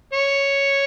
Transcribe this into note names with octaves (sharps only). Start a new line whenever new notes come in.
C#5